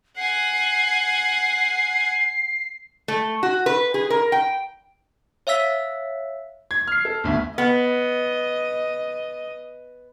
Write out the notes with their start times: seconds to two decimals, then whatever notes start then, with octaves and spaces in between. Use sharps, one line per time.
0.17 F#5 G#5 C7
3.08 A3
3.43 F#4
3.66 B4
3.94 G#4
4.10 A#4
4.32 G5
5.47 C#5 E5 F5 E6 B6
6.71 G#6
6.87 F6 C7
7.05 A4
7.24 G1 D2
7.58 B3 D#5